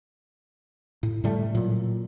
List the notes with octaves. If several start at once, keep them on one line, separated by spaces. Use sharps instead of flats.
A2
A2 D3 G3 A3
A#2 F#3